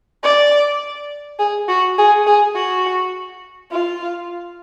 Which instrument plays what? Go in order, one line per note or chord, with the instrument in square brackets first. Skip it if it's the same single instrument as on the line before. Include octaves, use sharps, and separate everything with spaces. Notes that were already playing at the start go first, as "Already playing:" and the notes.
[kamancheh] D5
G#4
F#4
G#4
G#4
F#4
F4